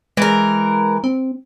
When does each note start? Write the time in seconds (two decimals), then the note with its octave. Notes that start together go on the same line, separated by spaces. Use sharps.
0.17 E3 G#3 A#4
1.04 C4